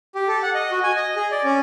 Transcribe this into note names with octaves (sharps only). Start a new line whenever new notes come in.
G4
A4
F#5
D#5
F#4
G#5
D#5
G#4
D5
C#4